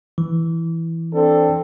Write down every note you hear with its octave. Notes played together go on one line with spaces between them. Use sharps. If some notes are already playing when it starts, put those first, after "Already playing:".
E3
C4 D4 A4